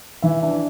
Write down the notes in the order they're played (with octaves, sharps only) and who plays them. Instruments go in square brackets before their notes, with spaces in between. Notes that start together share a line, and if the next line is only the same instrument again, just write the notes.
[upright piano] E3 E5
D4